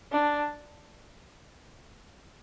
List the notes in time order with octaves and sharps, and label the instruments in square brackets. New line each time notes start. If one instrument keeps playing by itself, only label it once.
[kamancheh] D4